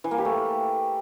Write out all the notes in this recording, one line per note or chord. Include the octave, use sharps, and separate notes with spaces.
E3
A#3
G4
A3